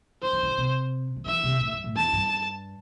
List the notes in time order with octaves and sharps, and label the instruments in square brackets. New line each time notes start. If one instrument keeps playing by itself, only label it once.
[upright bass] D3 [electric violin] C5
[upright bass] E3
D3
C3
D3
[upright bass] E3 [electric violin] E5
[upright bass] C3
A2
G2
A2
[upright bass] E2 [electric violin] A5
[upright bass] G2